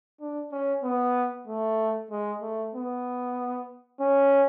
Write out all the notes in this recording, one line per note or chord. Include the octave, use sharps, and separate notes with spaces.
D4
C#4
B3
A3
G#3
A3
B3
C#4